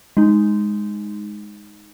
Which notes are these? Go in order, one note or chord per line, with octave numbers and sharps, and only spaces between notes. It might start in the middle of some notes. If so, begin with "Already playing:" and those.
G#3 D#4